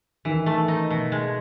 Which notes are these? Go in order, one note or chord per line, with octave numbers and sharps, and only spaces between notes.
D#3 E3
A3
D#4
B2
G#3